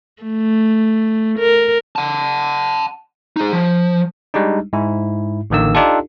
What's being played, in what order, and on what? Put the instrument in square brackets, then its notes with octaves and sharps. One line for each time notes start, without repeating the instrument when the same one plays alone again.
[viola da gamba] A3
A#4
[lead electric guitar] F#5 A5
D#4 G#4
F3
[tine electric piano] G3 G#3 D4 D#4
G#2 E4
A1 D3 D#3 A#3 E6
D4 D#4 F4 G4 A4